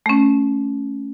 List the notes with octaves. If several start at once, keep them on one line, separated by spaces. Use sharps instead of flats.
A3 C#4